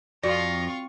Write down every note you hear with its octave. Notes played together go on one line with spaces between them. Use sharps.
F2 F4 F#4 D5 C#6 A#6